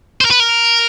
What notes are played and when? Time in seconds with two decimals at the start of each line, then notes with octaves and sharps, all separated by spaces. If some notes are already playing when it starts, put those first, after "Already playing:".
0.21 C5
0.25 A#4
0.31 B4
0.40 A#4